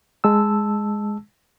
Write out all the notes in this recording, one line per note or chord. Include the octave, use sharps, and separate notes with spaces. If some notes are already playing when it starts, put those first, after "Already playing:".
G#3 A5 E6